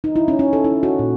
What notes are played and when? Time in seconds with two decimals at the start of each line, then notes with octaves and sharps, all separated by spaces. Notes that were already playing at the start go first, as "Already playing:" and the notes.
0.04 D#4
0.16 E4
0.28 C#4
0.39 C#4
0.53 A4
0.64 E4
0.83 F#4
0.99 A#2